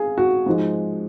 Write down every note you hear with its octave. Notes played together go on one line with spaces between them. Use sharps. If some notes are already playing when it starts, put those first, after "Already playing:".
Already playing: G#4 F5
F#4
G#2 F3 G#3